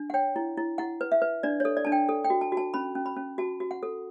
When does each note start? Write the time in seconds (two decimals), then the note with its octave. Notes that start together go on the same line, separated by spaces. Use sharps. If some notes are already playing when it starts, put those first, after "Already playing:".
Already playing: D4
0.10 F#5
0.14 C#5 G5
0.36 E4
0.57 E4
0.78 E4 F#5
1.01 B4
1.12 E5
1.22 B4
1.43 D4 D5
1.60 C#5
1.65 A4
1.77 D5
1.85 D4 A5
1.92 G5
2.09 A4
2.24 G5
2.30 F#4
2.41 A5
2.52 F#4
2.57 A5
2.74 C#4 B5
2.95 C#4
3.06 B5
3.16 C#4
3.38 F#4 A5
3.60 F#4
3.71 F#5
3.83 A4